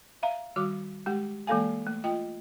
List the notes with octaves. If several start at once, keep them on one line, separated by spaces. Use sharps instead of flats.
E5 F5 A#5
D#3 G3 F#4 D6
G#3 G4 F#5
E3 G#3 A#3 A4 F5 G#5
A3
F4 D#5 G5